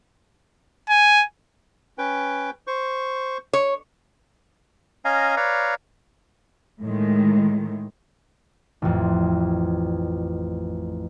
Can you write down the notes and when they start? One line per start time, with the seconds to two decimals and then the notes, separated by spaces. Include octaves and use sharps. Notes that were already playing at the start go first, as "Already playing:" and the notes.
0.90 G#5
1.98 C#4 B4 G5
2.67 C5 C#6
3.53 C#5
5.05 C#4 D#5 F5 G#5 A#5
5.37 B4 C#5 D5 F5 A#5
6.81 A2 D#3 G#3
8.82 A1 F2